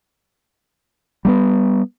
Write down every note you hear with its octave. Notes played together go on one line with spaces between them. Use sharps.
G3 A3 B3